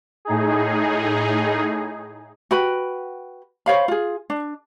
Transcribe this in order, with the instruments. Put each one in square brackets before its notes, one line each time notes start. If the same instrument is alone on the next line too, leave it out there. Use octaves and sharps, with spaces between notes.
[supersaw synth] A2 D#4 G#4
[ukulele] F#4 B4 G5 B5
C5 C#5 F5 B5
F4 G#4
D4